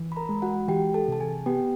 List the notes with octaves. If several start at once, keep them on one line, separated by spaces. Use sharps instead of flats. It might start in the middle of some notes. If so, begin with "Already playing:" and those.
Already playing: E3
B5
A#4 A#5
G#3
F#4 F#5
E3 G4 G5
A4 A5
C3 A5
G#4 G#5
B3 G4 G5